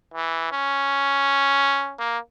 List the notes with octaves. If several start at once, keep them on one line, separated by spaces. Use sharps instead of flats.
E3
C#4
A#3